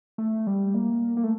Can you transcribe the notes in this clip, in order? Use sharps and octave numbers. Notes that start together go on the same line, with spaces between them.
A3
G3
A#3
A#3
A3